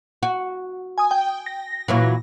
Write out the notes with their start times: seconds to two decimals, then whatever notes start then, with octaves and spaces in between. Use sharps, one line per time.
0.23 F#4
0.98 G#5 D#6
1.11 G5
1.46 A#6
1.88 A#2 E3 F#3